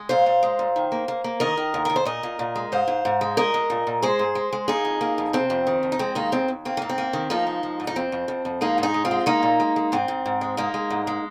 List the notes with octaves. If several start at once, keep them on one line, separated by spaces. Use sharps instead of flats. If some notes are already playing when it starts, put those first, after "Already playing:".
Already playing: G#3
A#2 C5 F5
A#2
G#3
A#2
D#3
A#3
A#3
A#3
D#3 A#4 D#5
D#3
D#2
D#2 A#4
C5
A#2 A#4 D#5
A#2
A#2
G#3
G#2 C5 F5
G#2
G#2
G#3
A#2 A#4 D#5
G#3
A#2
A#2
G#3 G#4 C5
G#2
G#3
G#3
A#3 D#4 G#4
F2
A#3
F2
C3 C4
F2
D#3
F2
D#4
G#3 C4
D#2 A#3 D#4
D#2 C4
D#2
A#3 C4
G#2 A#3
C4
A#3
D#3
F3 A#3 D#4
G#3
F3
G#2
D#4
F2 C4
F2
F2
F2
G#3 A#3 D#4
G#2
D#4 G#4
G#3
C4 F4
G#3
G#3 A#3 D#4
A#2
G#3
G#3
G#2 C4
G#2
G#2
G#3
G#3 A#3 D#4
G#3
G#2
G#3